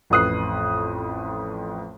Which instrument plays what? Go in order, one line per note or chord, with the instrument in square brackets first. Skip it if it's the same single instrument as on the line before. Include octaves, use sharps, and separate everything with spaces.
[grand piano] A1 F2 B4 D#6 F#6 C7